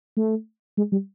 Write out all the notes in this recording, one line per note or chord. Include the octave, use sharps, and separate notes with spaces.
A3
G#3
G3